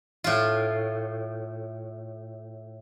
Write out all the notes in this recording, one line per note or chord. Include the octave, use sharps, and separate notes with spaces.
A2 F4